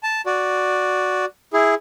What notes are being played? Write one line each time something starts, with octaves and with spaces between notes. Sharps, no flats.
A5
F#4 D5
E4 G#4